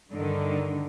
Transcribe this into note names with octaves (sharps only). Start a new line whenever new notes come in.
G2 D3 D#3